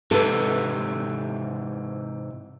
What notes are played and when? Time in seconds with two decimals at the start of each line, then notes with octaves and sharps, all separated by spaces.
0.11 G#2 C3 E3 A4 B4